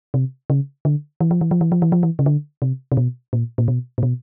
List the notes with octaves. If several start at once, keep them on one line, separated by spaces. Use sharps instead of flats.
C3
C#3
D3
E3
F3
E3
F3
E3
F3
E3
F3
E3
C#3
D3
C3
C3
B2
A#2
A#2
B2
A#2
B2